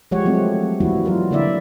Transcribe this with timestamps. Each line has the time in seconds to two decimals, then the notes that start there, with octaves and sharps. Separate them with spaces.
0.11 F3 G#3 G4 C#5 F#5
0.25 F#3 A3 C4
0.80 E3 G3 A#3 E4 F#4
1.05 F#3 E4 F4 A#4
1.31 D3 A#3 E4 D5 E5